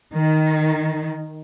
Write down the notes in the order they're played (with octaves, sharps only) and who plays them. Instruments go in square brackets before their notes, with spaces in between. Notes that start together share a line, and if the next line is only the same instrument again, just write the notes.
[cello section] D#3